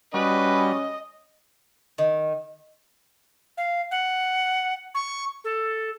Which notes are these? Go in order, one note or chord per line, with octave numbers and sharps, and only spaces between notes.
G3 C#4 F#4 B4 D#5
D#3
F5
F#5
C#6
A4